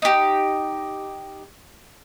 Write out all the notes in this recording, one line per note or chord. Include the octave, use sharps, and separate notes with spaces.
D#4 G4